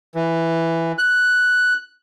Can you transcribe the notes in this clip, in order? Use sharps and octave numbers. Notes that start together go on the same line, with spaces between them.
E3
F#6